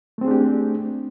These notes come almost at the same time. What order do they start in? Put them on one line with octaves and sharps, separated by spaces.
A3 C4 G#4 D4 G4